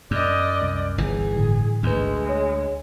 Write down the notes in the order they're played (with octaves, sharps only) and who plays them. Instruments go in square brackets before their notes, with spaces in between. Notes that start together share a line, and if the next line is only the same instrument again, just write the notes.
[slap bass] F#2 [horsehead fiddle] D5 D#5
[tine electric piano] C2
[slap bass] G1 E3 [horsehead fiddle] G#4
[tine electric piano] A2 D3
[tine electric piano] A1 G#2 B4 [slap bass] D2 [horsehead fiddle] G#3
[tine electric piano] C#5